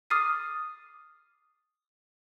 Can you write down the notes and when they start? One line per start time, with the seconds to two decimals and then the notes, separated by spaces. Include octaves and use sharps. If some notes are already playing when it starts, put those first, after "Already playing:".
0.10 D6 D#6 F6 A6 C7 D#7